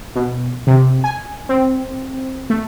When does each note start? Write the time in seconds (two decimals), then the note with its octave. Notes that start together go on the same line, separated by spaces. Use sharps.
0.15 B2
0.67 C3
1.04 G#5
1.49 C4
2.50 A3